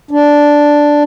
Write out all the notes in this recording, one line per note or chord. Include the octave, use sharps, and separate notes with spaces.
D4